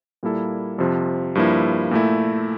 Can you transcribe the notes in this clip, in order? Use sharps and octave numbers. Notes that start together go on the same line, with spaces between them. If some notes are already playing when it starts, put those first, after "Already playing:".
A#2 G3 A#3 E4 A4
F2 C3 F3
G2 F3 A#3 E4
A#2 A3 E4